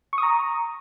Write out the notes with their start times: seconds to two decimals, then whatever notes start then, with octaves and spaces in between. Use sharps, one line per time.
0.13 C#6
0.18 D#6
0.23 A#5